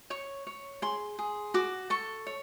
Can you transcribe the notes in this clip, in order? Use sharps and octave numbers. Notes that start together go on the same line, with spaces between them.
C#5 C#6
C#5
G#4 C6
G#4
F#4 D6
A4 C#6
C#5